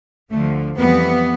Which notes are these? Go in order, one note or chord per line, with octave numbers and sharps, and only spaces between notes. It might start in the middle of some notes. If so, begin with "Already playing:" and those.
D2 D3 F3 A3
F2 E3 G3 B3